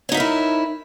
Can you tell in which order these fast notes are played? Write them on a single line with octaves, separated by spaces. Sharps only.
C#5 D#4 E5 A#4 E4